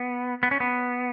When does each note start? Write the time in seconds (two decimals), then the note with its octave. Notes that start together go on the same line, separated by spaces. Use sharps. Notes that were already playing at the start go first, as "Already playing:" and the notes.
Already playing: B3
0.43 B3
0.51 C#4
0.60 B3